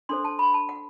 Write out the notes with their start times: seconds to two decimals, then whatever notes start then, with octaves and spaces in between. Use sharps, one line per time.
0.09 D4 A4 C5 C6
0.24 A5
0.39 B5
0.54 A5
0.69 F#5